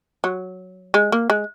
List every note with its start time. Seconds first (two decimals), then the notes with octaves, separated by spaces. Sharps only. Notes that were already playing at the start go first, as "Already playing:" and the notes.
0.24 F#3
0.94 G#3
1.12 A#3
1.30 G#3